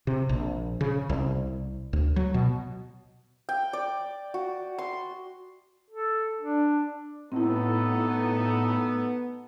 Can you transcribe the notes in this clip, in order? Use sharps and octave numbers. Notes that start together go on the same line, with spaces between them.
C3
A#1
C#3
C2
D2
F#3
B2
G5
D5
F#4
C6
A4
D4
A2 B3 C4 D#4 E4 F#4 A4